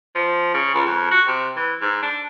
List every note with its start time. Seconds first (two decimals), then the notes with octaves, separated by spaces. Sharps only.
0.15 F3
0.54 C#3
0.74 C#2
0.86 F2
1.11 F#4
1.28 C3
1.57 E3
1.81 G#2
2.03 D4